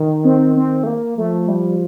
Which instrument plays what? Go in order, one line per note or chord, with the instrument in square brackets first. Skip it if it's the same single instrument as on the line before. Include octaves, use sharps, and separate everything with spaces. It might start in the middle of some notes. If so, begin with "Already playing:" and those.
Already playing: [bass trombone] D#3
[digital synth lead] C4
C4
A3
A#3
[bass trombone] F3 [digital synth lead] A3
[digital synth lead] G3